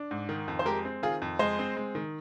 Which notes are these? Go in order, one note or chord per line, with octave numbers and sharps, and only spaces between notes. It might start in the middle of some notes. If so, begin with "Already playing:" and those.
Already playing: D4
G#2
D#3
F2
C5
G#3 G4 A#4
C4
D#3 F4 G#4
F2
G#3 C5 D#5
C4
G#3
D#3